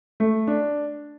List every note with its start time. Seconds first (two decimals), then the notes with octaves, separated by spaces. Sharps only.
0.20 A3
0.47 D4